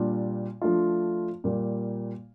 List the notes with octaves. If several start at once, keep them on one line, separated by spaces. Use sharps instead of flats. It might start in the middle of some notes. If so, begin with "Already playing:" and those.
Already playing: A#2 G3 D4 F4
F3 A3 D4 F4
A#2 G3 A#3